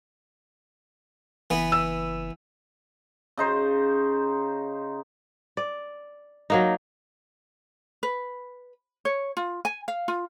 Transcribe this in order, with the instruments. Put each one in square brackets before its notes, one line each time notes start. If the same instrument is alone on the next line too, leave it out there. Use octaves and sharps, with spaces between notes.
[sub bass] F#1 [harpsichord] E3 B3
[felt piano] E6
[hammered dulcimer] C#3 D#4 C5
[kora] D5
F#3 A#3 D#4
[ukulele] B4
C#5
F4
G#5
F5
F4